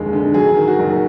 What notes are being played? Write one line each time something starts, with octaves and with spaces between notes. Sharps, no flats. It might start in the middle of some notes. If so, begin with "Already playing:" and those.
Already playing: F1 D#2 D3 G#3
D3
F#3 G#4
D#3
F#4
F#1